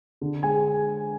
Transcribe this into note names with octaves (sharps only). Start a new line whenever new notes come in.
D3
G#3 G#5